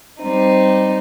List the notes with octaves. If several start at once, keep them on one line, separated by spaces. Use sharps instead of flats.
G3 C4 D#4